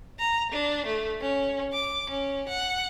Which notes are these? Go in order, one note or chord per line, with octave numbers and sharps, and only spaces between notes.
A#5
D4
A3
C#4
D6
C#4
F#5